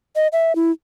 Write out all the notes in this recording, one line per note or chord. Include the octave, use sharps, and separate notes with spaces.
D#5
E5
E4